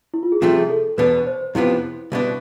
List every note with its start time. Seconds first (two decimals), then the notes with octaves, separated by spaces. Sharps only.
0.14 E4
0.23 F4
0.32 G#4
0.42 C2 C3 F3 A3 F4
0.56 G#4
0.70 A4
0.98 E2 B2 B3 D4 B4
1.26 C5
1.41 C5
1.55 F2 C3 F3 B3 D4 E4
2.12 C2 B2 B3 D4